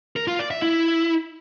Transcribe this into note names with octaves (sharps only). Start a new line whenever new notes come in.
A#4
F4
D5
E5
E4